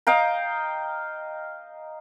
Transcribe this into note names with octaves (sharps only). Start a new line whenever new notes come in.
D#5 F5 G5 A#5